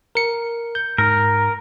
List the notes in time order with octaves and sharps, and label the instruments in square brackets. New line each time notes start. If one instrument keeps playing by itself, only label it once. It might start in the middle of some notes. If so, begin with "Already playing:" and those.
[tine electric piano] A#4 C#7
G6
[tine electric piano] G#2 [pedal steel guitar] A#4